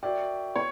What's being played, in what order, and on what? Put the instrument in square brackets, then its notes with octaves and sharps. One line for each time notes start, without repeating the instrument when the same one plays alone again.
[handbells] F#4 A#4 E5 G5 [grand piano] D5
[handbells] B3 [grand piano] C#5